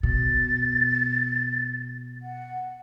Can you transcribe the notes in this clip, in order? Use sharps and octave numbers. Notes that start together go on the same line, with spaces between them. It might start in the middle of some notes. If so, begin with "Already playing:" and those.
B2 A6
F#5